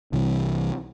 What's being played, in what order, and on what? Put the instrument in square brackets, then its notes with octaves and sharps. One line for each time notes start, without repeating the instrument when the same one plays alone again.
[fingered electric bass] C2 C3 E3 G3